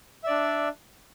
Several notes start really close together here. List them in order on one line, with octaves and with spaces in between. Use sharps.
E5 D5 D4